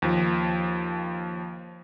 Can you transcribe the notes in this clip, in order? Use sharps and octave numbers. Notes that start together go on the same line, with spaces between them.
D#2 F3